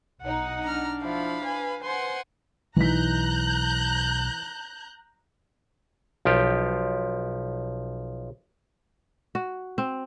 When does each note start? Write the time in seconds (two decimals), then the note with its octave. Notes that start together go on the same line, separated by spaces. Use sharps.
0.21 B1 D#4 F#5
0.63 D4 A#5 F6
1.02 F3 E4 F5 B5
1.43 B4 G#5
1.83 C5 F#5 G#5 C6
2.76 B1 E3 D#4 A#5 F#6 G6 B6
6.25 B1 F3 G4
9.35 F#4
9.78 C4